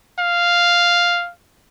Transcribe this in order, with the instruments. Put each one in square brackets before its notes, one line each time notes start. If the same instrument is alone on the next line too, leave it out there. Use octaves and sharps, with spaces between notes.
[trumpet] F5